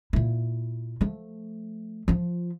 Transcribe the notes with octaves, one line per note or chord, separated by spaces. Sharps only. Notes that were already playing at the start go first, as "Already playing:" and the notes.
A#2 E4
F3 A3
F3 F4